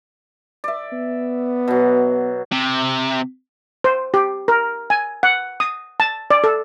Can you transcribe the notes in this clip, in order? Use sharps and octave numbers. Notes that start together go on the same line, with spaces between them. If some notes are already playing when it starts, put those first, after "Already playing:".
D5 E5
B3
B2 F#3
C3
C5
G4
A#4
G#5
F#5
D#6
A5
D5
A4